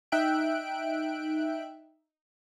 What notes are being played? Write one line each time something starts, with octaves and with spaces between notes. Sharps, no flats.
D#4 E5 G5 F#6 D7